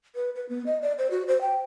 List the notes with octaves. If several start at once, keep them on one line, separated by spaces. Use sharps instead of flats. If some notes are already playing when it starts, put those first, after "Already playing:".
B4
B4
B3
D#5
D5
C5
F#4
C5
G5